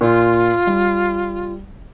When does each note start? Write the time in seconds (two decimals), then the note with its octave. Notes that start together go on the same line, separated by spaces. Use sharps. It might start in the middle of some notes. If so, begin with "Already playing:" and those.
0.01 A#2 F4
0.67 G3